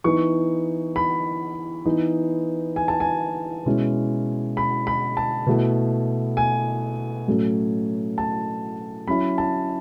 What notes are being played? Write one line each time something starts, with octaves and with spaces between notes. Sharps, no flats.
E3 B3 D#4 C#6
B5
E3 B3 D#4
G#5
A5
G#5
B2 G#3 C#4 E4
B5
B5
A5
B2 A3 E4
G#5
A2 F#3 A3 C#4
A5
F#3 C#4 E4 B5
A5